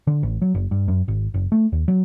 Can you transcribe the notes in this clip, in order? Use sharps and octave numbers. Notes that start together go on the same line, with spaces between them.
D3
A1
F#3
F#1
G2
F#2
G#1
F#1
A3
D#2
F#3